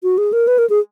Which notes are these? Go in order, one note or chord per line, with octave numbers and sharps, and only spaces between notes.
F#4
G#4
A#4
B4
A#4
G#4